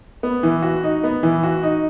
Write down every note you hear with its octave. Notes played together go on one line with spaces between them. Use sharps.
B3
E3
F#4
D#4
B3
E3
F#4
D#4